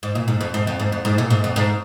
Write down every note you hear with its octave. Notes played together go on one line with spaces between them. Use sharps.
G#2
A#2
G#2
F2
G#2
F2
G#2
F2
G#2
A#2
G#2
F2
G#2